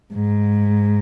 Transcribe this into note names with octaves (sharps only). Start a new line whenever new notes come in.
G#2